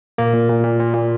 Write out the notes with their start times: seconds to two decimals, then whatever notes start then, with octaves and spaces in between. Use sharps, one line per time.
0.18 A#2 A#3
0.33 A#2
0.49 A#2
0.64 A#2
0.80 A#2
0.95 A#2